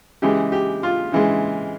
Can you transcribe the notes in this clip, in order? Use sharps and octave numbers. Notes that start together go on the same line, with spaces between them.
C#3 E3 G#3 G4
G4
F4
C#3 E3 G#3